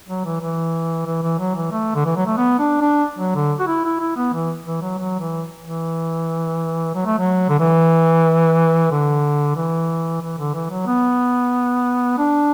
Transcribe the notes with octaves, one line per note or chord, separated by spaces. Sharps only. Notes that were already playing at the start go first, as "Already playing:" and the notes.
F#3
E3
E3
E3
E3
F#3
E3
A3
D3
E3
F#3
A3
B3
D4
D4
F#3
D3
F#4
E4
E4
E4
B3
E3
E3
F#3
F#3
E3
E3
F#3
A3
F#3
D3
E3
D3
E3
E3
D3
E3
F#3
B3
D4